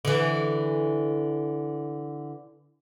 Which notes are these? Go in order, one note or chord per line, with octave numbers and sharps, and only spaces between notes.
D3 E3